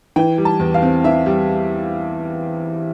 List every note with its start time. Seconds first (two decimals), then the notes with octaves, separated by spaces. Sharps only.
0.16 E3 G5
0.38 G3
0.45 A5
0.59 E2
0.74 F5
0.83 C4
1.04 E3 E5
1.26 G3